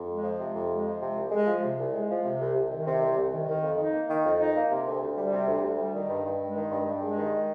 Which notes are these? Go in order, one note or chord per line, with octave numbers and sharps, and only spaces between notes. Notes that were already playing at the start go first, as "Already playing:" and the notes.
Already playing: F2
G#3
F3
C3
F2
G#3
F3
C3
C2
G#3
F3
C3
C2
G#3
F3
C3
C2
C2
D#3
C3
C2
C2
D#3
D#3
F2
D#4
A#3
D#3
F2
D#4
A#3
C3
D2
D2
G3
C3
D2
D2
G3
D#3
G2
G2
G#3
D#3
G2
G2
G#3
D#3